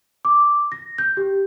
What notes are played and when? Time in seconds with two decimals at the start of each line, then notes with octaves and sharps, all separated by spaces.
0.25 D6
0.72 A#6
0.98 G6
1.17 G4